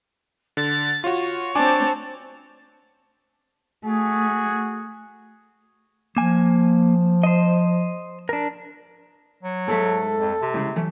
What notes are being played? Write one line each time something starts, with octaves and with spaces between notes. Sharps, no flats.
D3 A6
F4 F#4 C#5
C4 D4 G#5 A5 D6
A3 F#4 G#4
F3 A#3 G#5
C5 D#5
D4 A#4
F#3
G#2 G#3 A3 A4
F2
C3
A2 C#3 G#3
E3 F#3 A3